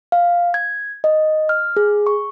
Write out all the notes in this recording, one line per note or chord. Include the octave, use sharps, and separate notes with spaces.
F5
G#6
D#5
F6
G#4
C#6